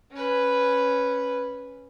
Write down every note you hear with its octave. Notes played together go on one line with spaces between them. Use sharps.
C#4 B4